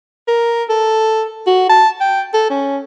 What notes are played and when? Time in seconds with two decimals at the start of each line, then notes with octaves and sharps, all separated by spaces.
0.28 A#4
0.69 A4
1.47 F#4
1.69 A5
2.01 G5
2.34 A4
2.50 C#4